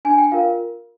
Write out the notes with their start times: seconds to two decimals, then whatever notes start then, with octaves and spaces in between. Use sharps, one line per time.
0.05 D4 G#5
0.18 G5
0.32 F4 A#4 F5